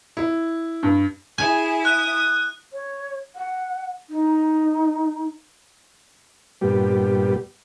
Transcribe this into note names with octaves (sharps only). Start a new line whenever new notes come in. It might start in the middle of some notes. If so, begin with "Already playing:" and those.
E4
G2
E4 G#4 G#5
D#6 F#6
C#5
F#5
D#4
G2 A#2 G3 B3 G4